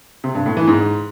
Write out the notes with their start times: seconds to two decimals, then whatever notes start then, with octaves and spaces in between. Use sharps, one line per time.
0.24 C3
0.35 G2
0.46 A2
0.57 E3
0.68 G#2